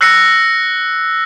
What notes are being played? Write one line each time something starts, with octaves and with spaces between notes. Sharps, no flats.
E6 F#6 A#6 C7 C#7